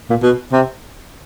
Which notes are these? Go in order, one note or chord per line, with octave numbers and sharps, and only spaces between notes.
A#2
B2
C3